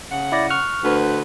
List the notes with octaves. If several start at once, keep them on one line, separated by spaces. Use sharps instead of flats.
C#3 F#5
E4 D5 A#6
C#6 F6 F#6
D2 B4